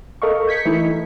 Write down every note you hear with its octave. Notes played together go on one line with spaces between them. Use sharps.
A4 A#4 D#5 F5 C#6
G6 G#6 B6 C#7
E3 A3 D#4 E4